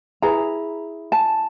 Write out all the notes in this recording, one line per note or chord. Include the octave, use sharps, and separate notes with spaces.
E4 G#4 B4 A#5
A5